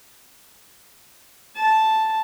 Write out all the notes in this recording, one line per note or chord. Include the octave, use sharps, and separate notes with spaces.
A5